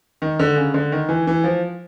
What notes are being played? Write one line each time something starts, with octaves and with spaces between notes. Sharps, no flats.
D#3
D3
C#3
D3
D#3
E3
E3
F3